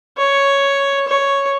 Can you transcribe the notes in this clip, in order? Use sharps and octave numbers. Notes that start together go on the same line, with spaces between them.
C#5
C#5